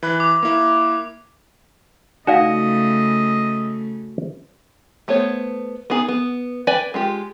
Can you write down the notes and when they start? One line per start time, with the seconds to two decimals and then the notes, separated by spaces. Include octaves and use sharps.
0.03 E3 B5 F#6
0.20 D6
0.43 A#3 E4
2.27 C#3 A3 D#4 F#4 D5 D#5 F5
5.08 A3 B3 C5 C#5
5.90 B3 D#4 G#4
6.08 B3
6.67 B4 D5 G5 G#5
6.94 G#3 F4 G4